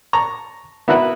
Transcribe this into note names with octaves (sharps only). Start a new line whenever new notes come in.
A5 A#5 C#6
B3 E4 F#4 A#4 B4